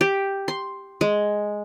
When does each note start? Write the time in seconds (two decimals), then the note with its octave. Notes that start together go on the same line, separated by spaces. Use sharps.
0.01 G4
0.48 C6
1.01 G#3